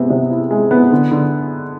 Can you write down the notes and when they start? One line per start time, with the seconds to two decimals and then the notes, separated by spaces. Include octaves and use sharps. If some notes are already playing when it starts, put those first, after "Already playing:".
Already playing: C3 G#3 B3
0.10 C3
0.30 E4
0.51 G#3
0.71 B3
0.92 D3
1.11 D3